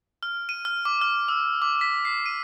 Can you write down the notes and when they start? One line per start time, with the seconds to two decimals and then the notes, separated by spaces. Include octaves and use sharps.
0.23 F6
0.49 D#7
0.65 F6
0.85 D6
1.01 F6
1.28 E6
1.62 D6
1.81 B6
2.05 C7
2.26 D#7